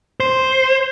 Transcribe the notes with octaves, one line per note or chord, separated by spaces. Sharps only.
C5